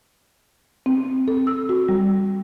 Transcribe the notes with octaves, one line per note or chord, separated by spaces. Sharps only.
C4
A4
E6
F#4
G3